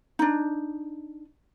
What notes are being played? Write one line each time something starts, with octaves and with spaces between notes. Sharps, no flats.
D4 D#4